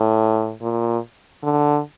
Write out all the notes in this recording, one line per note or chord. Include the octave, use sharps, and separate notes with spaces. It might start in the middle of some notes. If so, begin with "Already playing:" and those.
Already playing: A2
A#2
D3